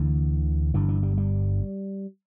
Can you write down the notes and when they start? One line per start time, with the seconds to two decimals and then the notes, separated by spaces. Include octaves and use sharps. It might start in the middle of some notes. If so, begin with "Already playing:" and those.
Already playing: D2 D3 E3
0.74 G1 G2 D3 E3
0.88 E3
1.03 G3
1.18 G3